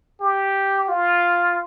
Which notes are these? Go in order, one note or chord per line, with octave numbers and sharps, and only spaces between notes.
G4
F4